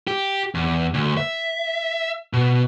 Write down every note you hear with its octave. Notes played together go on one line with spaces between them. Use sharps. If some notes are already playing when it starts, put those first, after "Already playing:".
G4
E2
D2
E5
B2